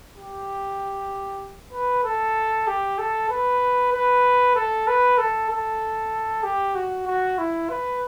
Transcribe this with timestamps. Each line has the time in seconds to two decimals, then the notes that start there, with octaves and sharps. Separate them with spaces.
0.16 G4
1.73 B4
2.04 A4
2.67 G4
2.98 A4
3.30 B4
3.93 B4
4.56 A4
4.87 B4
5.18 A4
5.50 A4
6.43 G4
6.75 F#4
7.07 F#4
7.38 E4
7.69 B4